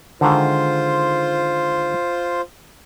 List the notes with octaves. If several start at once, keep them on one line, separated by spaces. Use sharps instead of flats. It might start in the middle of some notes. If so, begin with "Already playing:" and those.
D3 D#3 G#3 F4 C5